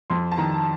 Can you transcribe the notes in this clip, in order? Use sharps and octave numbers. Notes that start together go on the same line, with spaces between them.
F2 C6
A5
D#3 A#5